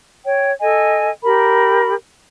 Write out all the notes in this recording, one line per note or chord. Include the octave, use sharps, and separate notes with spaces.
C#5 G5
A4 D#5 G#5
G4 A#4 B5